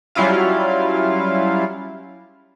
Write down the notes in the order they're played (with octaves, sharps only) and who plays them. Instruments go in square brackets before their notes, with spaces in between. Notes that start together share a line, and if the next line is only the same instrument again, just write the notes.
[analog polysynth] F#3 G3 C#4 E4 F4 F5